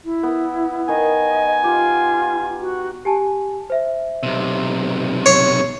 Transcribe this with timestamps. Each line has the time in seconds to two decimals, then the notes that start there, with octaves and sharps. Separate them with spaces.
0.04 E4
0.23 B3
0.88 D#3 D#5 G#5
1.64 F4 G4
2.60 F#4
3.05 G4 G#5 A5
3.70 C5 E5
4.23 B1 C3
5.26 C#5 C7